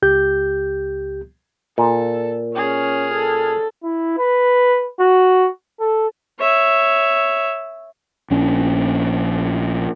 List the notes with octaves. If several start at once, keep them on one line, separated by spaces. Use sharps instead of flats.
C#2 G4 G6
A#2 A4
C#4 G#4 F6
A4
E4
B4
F#4
A4
C#5 E5
A#1 C#4 D4